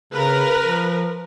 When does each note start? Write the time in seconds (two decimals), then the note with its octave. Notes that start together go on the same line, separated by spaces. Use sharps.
0.13 C#3 A#4 B4
0.64 F3